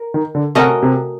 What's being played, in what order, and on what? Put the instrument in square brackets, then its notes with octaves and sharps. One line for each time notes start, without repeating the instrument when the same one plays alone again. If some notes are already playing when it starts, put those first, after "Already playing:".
Already playing: [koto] A#4
[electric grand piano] D#3
D3
[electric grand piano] C3 [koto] A3 C#4 F#4 A#4 D#5
[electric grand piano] C3